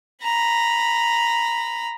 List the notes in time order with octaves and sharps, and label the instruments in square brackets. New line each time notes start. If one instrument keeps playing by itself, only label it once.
[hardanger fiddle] A#5 B5